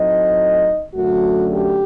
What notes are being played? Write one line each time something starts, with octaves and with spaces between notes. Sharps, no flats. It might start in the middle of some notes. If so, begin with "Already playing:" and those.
Already playing: A2 F#3 A3 C4 D#4 D#5
F#2 D3 A3 F#4
G4